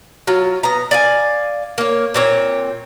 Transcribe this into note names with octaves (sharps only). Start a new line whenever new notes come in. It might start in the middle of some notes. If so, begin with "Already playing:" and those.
F#3 F4
B3 A#5
D5 F5 G#5
A#3 C#5
A#2 C4 C#5